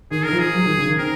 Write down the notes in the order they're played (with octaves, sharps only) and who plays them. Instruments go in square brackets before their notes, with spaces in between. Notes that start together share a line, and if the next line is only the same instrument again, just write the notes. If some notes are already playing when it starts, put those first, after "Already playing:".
[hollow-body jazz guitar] D#3 [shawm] G#4
[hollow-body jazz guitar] D#3 [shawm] A#4
[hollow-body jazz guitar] F3
[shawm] G#4
[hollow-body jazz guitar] F#3
D#3
C#3
D#3
[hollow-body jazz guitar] C4 [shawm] A#4